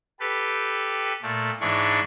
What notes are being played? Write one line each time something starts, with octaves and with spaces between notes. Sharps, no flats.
G4 A4 B4
A#2 A3
G#2 E3 D4 C#6